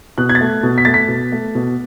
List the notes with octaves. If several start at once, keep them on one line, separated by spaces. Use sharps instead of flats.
B2 F#6
G#6
A6
A3
B2
B6
A3 A6
B6
B2
A3
B2